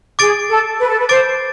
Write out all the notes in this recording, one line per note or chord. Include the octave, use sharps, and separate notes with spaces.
G#4 D6 A6 D7
A4
B4
A4
B4
C5 D6 A6 D7